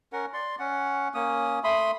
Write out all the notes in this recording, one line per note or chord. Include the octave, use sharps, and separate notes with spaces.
C#4 A#4 F#5
D5 C6
C#4 F#5
A#3 C#4 D#6
A3 B5 C6 D#6